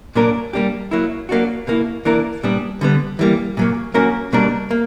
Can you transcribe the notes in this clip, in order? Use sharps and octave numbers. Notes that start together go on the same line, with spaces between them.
A#2 F#3 A#3 D4 A#4
G3 A#3 D4 G4
F#3 A#3 E4
F#3 A#3 D4 F#4
B2 A#3 E4
E3 A#3 D4 A#4
A#2 G3 B3 D4
D3 G3 B3
E3 G3 A#3
A#2 F#3 A#3
F#3 A#3 C#4 F#4 A#4
B2 G3 A#3 D4 A#4
A#3